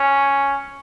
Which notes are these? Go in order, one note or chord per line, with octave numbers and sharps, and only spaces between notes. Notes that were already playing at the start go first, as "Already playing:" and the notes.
Already playing: C#4